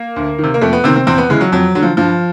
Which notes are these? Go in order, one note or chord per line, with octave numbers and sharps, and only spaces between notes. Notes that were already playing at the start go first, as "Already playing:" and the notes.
Already playing: A#3
D2
C3 D#3
A#3
F2 A3
B3
C3 D#3 C4
C4
E2 C4
B3
C#3 E3 G#3
F#3
F2 F#3
D3 F#3
F3
G2 F3